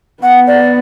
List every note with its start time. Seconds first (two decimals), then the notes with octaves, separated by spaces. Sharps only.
0.22 B3 F#5
0.47 D5